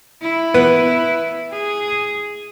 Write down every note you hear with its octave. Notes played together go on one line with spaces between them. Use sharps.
E4
B3
G#4